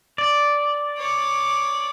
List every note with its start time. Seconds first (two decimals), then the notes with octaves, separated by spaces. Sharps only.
0.18 D5
0.98 C#5 D6